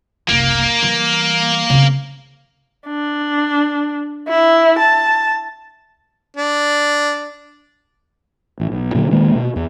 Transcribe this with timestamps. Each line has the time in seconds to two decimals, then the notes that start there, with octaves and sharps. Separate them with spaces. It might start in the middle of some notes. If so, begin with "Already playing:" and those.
0.28 F#1 C2 A#3
0.83 E3 G3
1.70 C#3 C4
2.87 D4
4.28 E4
4.78 A5
6.37 D4
8.60 A1
8.71 B1
8.94 A#2 D3 F#3
9.11 D#1 D#3 G#3 A#3
9.35 B2
9.56 E2